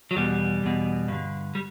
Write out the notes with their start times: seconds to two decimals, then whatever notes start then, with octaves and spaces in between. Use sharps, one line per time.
0.11 F#3
0.16 E2 B2 G3
0.63 E2 B2
1.08 G2 D3
1.55 G3